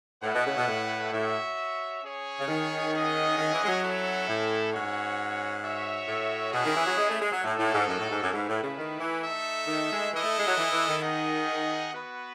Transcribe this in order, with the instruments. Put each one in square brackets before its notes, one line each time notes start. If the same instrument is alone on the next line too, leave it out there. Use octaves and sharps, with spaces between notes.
[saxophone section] A2 [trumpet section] A3 E4 B4 F#5
[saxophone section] B2
C#3
B2
A2
[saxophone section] A2 [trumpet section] F#4 C#5 E5
[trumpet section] C#4 G#4 C#5
[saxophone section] C#3
D#3
[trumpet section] C#4 G#4 D#5 F#5
[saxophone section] D#3
E3
G#3
F#3
[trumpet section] C#4 E4 A4
[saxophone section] A2
[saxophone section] G#2 [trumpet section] C#4 F#4 C#5 F#5
[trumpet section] F#4 C#5 E5
[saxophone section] A2
[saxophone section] B2 [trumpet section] C#4 E4 G#4
[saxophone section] D#3
E3
F#3
G#3
A3
G#3
F#3
[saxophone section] A2 [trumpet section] D#4 F#4 A4
[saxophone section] A2
G#2
F#2
A2
G#2
F#2
[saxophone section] G#2 [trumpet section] A3 E4 B4
[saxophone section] A2
C#3
D#3
E3
[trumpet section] A3 D#4 A4 E5
[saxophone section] D#3
G#3
[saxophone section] E3 [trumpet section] E4 A4 D#5
[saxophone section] A3
G#3
F#3
E3
E3
D#3
[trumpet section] D#4 G#4 D#5 F#5
B3 F#4 B4